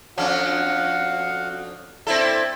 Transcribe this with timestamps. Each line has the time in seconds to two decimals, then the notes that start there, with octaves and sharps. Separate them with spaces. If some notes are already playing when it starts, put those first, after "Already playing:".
0.18 F2 C#4 D4 F#4 F5 F#5
2.07 C4 E4 A4 D5 E5 D6